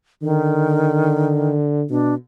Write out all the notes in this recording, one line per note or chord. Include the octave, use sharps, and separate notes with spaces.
D3 D#3
B2 D4